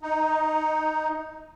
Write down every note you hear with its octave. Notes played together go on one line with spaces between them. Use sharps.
D#4